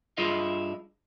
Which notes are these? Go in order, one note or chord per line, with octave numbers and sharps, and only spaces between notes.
G2 E4 F4 G#4 D#5 F5